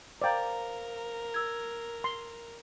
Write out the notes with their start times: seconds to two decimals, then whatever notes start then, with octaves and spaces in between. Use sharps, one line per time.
0.22 A#4 C5 D5 F5 G5 A#5
1.34 E6 G#6
2.04 C6